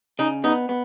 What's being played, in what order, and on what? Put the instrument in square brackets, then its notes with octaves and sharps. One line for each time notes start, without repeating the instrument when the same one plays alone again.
[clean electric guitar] C#3 [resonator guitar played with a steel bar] D#4
[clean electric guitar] B3 [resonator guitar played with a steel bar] D#4
[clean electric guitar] B3